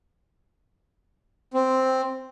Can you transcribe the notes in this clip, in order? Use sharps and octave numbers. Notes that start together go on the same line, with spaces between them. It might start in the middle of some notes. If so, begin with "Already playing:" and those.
C4